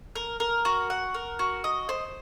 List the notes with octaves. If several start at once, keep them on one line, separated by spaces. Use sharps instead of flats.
A#4
A#4
F#4
F#5
A#4
F#4
D#5
C5